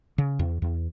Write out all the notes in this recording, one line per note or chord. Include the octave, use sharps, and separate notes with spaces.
C#3
E2
E2